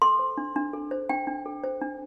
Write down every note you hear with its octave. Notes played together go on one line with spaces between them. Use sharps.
A4 C6
C5
D4
D4
A4
C5
D4 G5
D4
A4
C5
D4